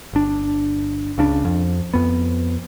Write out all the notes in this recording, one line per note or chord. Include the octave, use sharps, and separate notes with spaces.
G1 D4
C#2 C#3 D4
F2
F2 B3